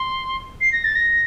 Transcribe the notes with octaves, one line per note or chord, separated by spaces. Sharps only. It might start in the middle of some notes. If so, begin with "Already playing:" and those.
Already playing: C6
C7
A#6
A6
A#6